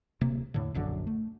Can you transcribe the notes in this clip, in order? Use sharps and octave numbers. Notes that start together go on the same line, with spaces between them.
D1 C3 A#3
E2 A2 D3
D1 A#1 F#2 D3
A3